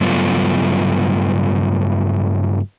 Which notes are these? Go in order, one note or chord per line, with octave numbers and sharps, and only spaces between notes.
G2 C#3 F#3 A3 B3 F4